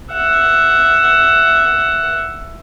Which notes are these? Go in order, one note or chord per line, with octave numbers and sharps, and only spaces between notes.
E5 F#5